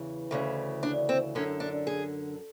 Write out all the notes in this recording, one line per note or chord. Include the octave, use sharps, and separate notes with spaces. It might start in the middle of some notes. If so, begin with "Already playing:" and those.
Already playing: E2 C#3 E3
D2 C#3 E3
D4
C4
F#2 D3 C#4
D4
G#4